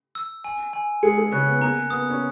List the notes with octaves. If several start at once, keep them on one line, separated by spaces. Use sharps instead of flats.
E6
G#5
G#5
G#3 G#4 C#7
G#3 G#4
C#3 C#4 F#6
B3
A#3 A#5
B3 D#6
C#4